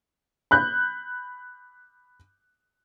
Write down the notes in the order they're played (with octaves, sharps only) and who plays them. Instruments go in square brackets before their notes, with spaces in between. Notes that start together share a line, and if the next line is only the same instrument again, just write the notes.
[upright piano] B5 F#6 G6